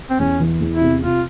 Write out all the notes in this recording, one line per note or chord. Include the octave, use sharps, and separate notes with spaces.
C4
E2 C#4
E3
E2
E4
C3
C3 F4